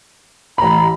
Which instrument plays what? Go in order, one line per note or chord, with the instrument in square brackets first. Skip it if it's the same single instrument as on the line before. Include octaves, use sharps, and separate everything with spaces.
[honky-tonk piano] A1 B5 [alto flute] A#5